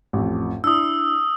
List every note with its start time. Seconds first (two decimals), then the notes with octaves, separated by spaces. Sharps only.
0.13 A1 F2
0.64 D4 E4 D#6 E6